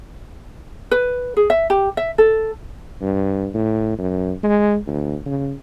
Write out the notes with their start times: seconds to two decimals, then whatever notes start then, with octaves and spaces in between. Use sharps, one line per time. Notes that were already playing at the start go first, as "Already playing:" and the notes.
0.91 B4
1.37 G#4
1.50 E5
1.70 G4
1.97 E5
2.18 A4
3.02 G2
3.54 A2
3.98 F#2
4.43 G#3
4.87 D2
5.26 C#3